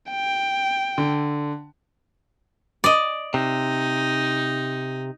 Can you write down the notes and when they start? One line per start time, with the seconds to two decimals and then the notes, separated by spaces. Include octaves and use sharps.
0.11 G5
0.98 D3
2.84 D5 D#5
3.34 C3 D#4